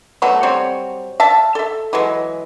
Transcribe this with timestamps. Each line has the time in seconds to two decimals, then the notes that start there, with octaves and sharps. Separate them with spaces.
0.22 F#3 A3 B3
0.43 F#3 G3 C4 C#5
1.20 E5 F5 A5
1.55 A4 E5
1.93 E3 F#3 G#3